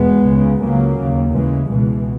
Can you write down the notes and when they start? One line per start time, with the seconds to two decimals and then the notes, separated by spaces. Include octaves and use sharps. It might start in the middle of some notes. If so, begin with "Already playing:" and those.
Already playing: E2 B2 G#3 B3
0.26 C#2 C#3
0.61 C#2 C#3 F#3 A#3
0.98 D#2 C#3
1.34 D#2 C#3 E3 G#3
1.70 C#2 B2 E3 G#3